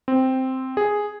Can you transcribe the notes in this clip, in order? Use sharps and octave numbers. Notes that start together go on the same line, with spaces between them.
C4
G#4